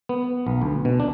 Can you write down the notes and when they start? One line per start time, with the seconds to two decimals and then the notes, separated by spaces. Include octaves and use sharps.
0.09 B3
0.47 B1
0.62 D2
0.85 B2
1.00 D4